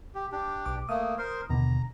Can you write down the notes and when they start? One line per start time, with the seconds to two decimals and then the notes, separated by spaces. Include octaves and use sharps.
0.15 G4
0.32 D4 G4
0.66 B1 D6
0.89 A3 A#3 D#6
1.18 A#4 C5 C6
1.50 D#2 B2 D3 A#5